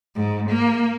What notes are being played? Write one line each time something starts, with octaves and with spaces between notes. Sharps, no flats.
G#2
A#3